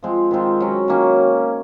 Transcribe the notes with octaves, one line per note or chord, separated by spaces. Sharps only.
F3 G#3 C4
D#3 G#3 C4 F4
F#3 C#4 F#4
D#3 A#3 C#4